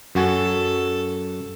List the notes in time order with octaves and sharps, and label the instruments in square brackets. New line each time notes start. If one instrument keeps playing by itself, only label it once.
[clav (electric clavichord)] F#2 F#4 G#5 [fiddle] A4